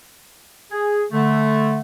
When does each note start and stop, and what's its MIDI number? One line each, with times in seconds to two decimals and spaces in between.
0.71 1.03 68
1.12 1.80 50
1.12 1.80 57